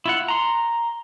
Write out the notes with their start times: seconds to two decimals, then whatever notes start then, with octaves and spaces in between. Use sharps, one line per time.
0.06 E4 F4 F#5
0.28 A#5 C6